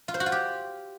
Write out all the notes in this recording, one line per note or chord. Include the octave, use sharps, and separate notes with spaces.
F4
C5
F#4
F4
G4